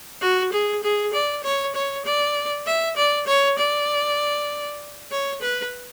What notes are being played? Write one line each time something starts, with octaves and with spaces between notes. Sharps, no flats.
F#4
G#4
G#4
D5
C#5
C#5
D5
E5
D5
C#5
D5
C#5
B4